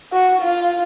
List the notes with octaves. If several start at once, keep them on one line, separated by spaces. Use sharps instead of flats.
F#4
F4